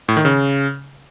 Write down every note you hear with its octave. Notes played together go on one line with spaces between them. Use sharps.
A2
D#3
C#3